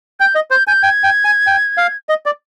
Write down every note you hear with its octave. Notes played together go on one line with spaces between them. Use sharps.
G5 G6
D#5
C5 G6
G#5 G6
G5 G#6
G5
G#5
G5
F5
D#5
D5